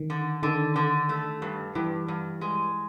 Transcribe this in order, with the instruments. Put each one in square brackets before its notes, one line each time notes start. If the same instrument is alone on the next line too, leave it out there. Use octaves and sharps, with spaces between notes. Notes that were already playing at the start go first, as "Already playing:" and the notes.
Already playing: [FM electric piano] D#3
[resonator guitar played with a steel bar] D3
[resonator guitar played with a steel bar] D3 [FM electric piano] D#3
[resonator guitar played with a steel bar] D3
A3
G2
[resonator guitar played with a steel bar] G2 [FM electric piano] E3
[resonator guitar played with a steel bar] G2
G#3